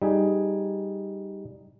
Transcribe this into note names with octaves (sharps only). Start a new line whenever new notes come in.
G3 D#4 G#4